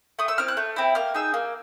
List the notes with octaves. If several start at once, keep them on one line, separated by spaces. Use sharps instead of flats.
A3 D#6
E6
C4 E4 F6
F#6
A3
C4 E4
A#3 F6
D#4 G#4 E6
A#3